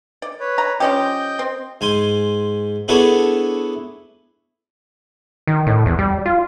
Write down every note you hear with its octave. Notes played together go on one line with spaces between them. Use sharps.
D5
B4 C#5
A#5
F3 C#4 G4 D#5 G5 G6
C4
G#2 G#5 C6
B3 D4 E4 G#4 A4 C#5
D#3
A2
E2
G3
F4